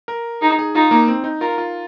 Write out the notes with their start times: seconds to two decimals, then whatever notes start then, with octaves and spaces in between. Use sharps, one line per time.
0.08 A#4
0.41 D#4 G#4
0.59 G#4
0.75 D#4 F4
0.91 A#3
1.08 C4
1.24 D#4
1.41 F4 A#4
1.58 F4